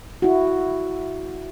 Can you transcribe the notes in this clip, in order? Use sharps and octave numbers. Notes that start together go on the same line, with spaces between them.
E4 F#4